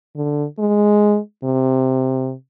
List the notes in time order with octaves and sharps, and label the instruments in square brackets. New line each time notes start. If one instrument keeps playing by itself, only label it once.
[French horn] D3
G#3
C3